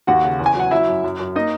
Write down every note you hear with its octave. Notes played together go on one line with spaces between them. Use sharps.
D#2 F#4 F#5
C#3
E2
G#5
F#3 F#5
F#3 E4 E5
F#2
F#2
F#2
A#3 D#4 D#5